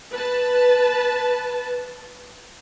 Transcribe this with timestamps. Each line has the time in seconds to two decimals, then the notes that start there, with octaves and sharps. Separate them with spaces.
0.11 B4 A5